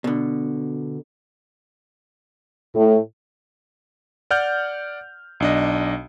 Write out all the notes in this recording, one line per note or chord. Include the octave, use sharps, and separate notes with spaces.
B2 D3
A2
D5 F#5 F6 G6
B1 D4 D#5